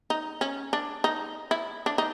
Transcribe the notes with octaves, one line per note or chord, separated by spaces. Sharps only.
D#4
C#4
D4
D#4
E4
D4
D#4